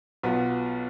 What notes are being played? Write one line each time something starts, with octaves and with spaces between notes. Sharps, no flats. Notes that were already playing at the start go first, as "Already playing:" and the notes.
B1 B2 B3 F4